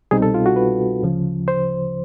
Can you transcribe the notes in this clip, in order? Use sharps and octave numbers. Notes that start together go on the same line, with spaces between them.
C2 B2 G3 C4 D#4 G#4
A4
F4
F#4
B4
D2 C#3 F3
C5